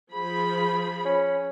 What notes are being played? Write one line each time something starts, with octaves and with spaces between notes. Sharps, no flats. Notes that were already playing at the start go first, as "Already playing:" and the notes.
F3 G#4 B5
C#4